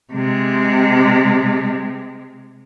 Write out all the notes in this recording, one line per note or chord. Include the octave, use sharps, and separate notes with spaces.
C3 G#3